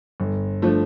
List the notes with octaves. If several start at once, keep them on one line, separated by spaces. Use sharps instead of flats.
G1
F3 A3 D4